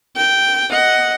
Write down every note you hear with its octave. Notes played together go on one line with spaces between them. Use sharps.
G5
D#5 F#5